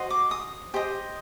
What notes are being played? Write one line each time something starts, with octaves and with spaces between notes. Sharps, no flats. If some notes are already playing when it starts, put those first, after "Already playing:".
Already playing: F#4 C5 D#5
D6
D#6
G4 C5 D#5